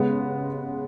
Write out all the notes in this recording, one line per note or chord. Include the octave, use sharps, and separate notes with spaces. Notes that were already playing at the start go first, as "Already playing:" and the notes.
Already playing: C#3 G#3 B3